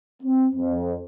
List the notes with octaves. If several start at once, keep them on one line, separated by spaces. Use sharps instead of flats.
C4
F2